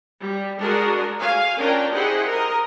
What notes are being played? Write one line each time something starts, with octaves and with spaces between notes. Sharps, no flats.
G3
G#3 D4 F#4 G#4 A#4
F5 G#5
C#4 D4 F4 A#4 G5
E4 G4 G#4 C5 D#5 F#5
A#4 D#5